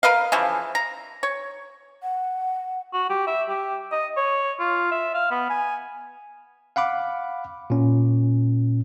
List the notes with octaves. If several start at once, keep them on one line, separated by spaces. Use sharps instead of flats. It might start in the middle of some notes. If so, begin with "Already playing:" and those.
A#4 B4 D#5 F5
C#3 E3 F3
A#5
C#5
F#5
F#4
G4
E5
G4
D#5
C#5
F4
E5
F5
B3
G#5
F5 F#5 B5 D6
A#2 C#4